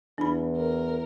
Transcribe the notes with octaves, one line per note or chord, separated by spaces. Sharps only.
E2 D4 E4 B5
A#4